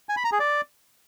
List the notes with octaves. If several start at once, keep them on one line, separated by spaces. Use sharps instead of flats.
G#5
B5
A#5
G#4
D5